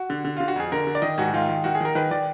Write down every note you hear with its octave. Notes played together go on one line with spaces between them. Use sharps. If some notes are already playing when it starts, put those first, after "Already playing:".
Already playing: F#4
D3
D3
D3 F4
F#4
F2 G#4
D3 A#4
D3
D5
D#3 D#5
G#2 F#4
D#3 F4
D#3
D#3 F#4
G#4
D#3 A#4
D#3 B4
D#3 D5